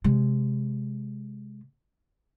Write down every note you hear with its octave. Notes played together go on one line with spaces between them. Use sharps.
C3 G#3